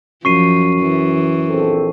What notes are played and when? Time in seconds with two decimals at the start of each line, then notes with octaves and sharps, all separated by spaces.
0.25 F#2 F3 C#6 C7 D#7
0.81 E3
1.49 A#1 C4 A4